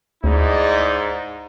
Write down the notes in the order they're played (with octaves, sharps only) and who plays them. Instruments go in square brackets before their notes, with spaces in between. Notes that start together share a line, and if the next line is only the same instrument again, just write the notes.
[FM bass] D2 [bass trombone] G#2 [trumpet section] D#4 E4 D5